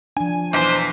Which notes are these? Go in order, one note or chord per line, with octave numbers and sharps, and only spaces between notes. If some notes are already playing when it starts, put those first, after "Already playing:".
F3 D4 G#5
B1 E2 C5 B6